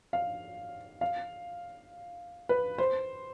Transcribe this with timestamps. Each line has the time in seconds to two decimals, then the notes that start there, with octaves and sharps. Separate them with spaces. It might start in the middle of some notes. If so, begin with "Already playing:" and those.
0.13 F5
1.01 F5
2.49 B4
2.78 C5